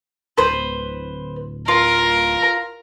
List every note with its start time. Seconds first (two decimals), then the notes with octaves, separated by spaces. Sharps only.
0.38 D1 B4 C5
1.68 F4 A#4